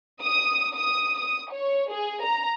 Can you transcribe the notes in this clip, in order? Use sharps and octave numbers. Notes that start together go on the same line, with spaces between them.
D#6
D#6
D#6
C#5
G#4
A#5